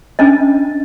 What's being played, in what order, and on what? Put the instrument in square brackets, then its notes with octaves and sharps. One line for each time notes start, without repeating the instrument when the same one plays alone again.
[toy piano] C#4 D4 D#5